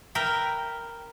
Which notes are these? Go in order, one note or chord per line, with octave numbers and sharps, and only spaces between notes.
A#4 B4 E5 G5